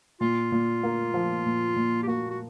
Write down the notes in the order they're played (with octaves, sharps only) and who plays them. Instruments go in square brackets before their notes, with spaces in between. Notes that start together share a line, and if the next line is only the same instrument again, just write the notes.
[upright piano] A#2 [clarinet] F4
[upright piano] A#2
A#3
F3
A#2
A#2
[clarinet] G4
[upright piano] A#3 [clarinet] F#4
[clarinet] F#4